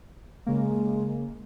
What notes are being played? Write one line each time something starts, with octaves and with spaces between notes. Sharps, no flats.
C#3 G#3 A#3